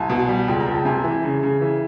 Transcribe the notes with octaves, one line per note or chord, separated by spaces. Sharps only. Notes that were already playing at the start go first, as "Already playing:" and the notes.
Already playing: C2 G#5 A5
B2
G3
C#2 G5
A#5
C#2
A5
C3 G#5
E3
C#3
C#3
E3